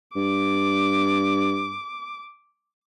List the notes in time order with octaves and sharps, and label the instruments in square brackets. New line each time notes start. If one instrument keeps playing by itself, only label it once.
[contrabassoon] G2 [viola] D6